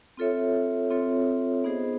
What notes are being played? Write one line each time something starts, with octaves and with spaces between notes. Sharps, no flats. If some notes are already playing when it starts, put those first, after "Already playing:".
C4 F4 A4 C#5 E5
C4 F4 A4 C#5 E5
B3 D#4 G#4 C5 D#5